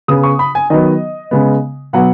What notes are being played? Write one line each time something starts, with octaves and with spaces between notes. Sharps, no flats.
C#3 B3 D#6
C#6
B5
G#5
D#3 F#3 B3 D#5
C#3 G#3 B3
B2 F#3 B3 F#5